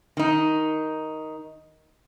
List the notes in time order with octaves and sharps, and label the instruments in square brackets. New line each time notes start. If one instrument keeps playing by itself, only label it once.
[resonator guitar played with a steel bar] D#3 D#4